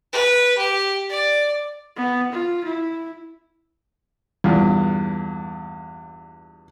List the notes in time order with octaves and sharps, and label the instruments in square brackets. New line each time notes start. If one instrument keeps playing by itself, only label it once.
[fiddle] B4
G4
D5
[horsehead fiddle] B3
F4
E4
[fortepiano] E2 G2 A#2